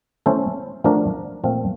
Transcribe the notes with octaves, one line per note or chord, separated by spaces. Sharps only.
A3 C#4 E4 A4 C5
F3 A3 D4 F#4 A#4
A#2 F3 A3 C4 F4